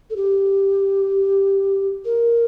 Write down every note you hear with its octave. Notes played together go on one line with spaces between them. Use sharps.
A4
G4
A#4